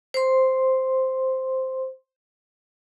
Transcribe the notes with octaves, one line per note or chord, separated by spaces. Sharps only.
C5 C6